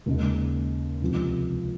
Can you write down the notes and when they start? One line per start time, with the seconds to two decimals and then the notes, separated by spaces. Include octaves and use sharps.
0.06 D#2 C#3 G#3
1.02 C#2 C3 F3